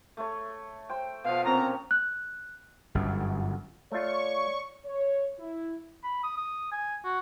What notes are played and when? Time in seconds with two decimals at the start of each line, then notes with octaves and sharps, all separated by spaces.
0.17 A3 C#5
0.89 C5 G5
1.24 B2 F3 F5
1.45 A#2 C4 C#4 A#5
1.91 F#6
2.95 G1 F#2
3.92 A3 F4 C#5 D5 C#6
4.85 C#5
5.40 E4
6.04 B5
6.23 D#6
6.37 D#6
6.72 G#5
7.04 F#4